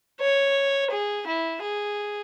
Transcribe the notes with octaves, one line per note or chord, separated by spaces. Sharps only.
C#5
G#4
E4
G#4